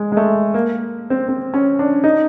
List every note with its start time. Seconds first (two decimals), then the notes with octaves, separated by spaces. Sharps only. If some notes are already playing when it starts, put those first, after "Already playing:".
Already playing: G#3
0.12 G#3
0.17 A3
0.54 A#3
1.10 C4
1.28 C4
1.54 C#4
1.79 D4
2.04 D#4